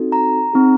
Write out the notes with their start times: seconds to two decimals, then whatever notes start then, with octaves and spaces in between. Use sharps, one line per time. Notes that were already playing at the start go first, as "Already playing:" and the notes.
Already playing: C4 D#4 F#4 A4
0.12 A#5
0.53 C4 D#4 G#4